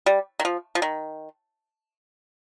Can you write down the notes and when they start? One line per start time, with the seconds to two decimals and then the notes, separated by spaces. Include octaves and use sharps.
0.06 G3
0.40 D#3
0.45 F3
0.75 F3
0.82 D#3